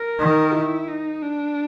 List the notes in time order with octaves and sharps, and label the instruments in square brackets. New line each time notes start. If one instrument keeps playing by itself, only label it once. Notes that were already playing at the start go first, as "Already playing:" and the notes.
Already playing: [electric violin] A#4
[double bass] D#3
[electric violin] E4
D#4
D4